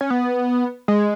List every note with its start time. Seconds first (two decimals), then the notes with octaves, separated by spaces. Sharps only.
0.01 C#4
0.10 B3
0.88 G#3